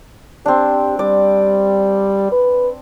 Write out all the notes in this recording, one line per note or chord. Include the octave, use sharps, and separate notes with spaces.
C4 D4 G4
G3 D5
B4